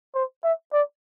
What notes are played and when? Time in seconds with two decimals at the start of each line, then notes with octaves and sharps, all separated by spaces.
0.14 C5
0.44 E5
0.73 D5